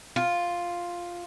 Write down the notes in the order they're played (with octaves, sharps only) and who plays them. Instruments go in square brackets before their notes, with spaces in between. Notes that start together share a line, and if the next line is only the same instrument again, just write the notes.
[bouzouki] F4